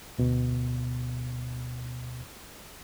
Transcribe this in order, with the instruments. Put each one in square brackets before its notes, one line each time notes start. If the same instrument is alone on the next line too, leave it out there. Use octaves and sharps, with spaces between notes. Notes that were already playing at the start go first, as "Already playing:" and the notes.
[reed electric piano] D2 B2